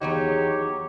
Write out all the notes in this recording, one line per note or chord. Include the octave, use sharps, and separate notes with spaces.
E2 F#3 D#4 F#4 G4 C#5